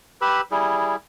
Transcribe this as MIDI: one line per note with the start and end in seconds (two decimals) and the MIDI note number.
0.21 0.41 67
0.21 0.41 71
0.21 0.41 83
0.21 0.41 88
0.51 0.96 55
0.51 0.96 64
0.51 0.96 68